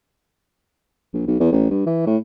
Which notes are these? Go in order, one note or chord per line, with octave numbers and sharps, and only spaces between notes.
A#1
B1
E2
A1
G2
E3
A2